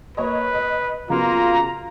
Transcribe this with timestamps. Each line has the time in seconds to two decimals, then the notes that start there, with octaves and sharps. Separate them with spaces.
0.17 A#3 B4 C#5 D#5
0.54 D#5
1.10 C#3 F#3 A#3 B3 F4 A#5